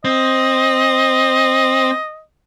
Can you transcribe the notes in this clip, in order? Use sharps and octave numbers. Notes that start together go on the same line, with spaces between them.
C4 D#5